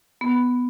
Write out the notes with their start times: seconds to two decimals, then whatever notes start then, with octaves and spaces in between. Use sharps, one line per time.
0.21 B3